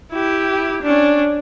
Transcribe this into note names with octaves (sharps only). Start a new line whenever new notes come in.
E4 G4
C#4 D4